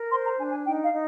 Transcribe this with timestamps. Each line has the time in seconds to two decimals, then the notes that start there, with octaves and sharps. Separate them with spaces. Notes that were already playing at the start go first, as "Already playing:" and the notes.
Already playing: A#4
0.10 C5 C6
0.24 A#5
0.38 D4 G#5
0.51 G#5
0.65 D#4 G5
0.83 F5
0.92 D#4